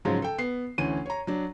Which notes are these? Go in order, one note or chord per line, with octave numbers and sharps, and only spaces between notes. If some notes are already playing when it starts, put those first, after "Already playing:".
G#2 C#3 F3 F#3
A4 G5
B3 C7
D2 E3 C#4 D#7
C#5 A#5
F#3 D4